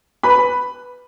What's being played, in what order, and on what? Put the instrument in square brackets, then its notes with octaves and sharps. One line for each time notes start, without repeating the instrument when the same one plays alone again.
[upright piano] B4 B5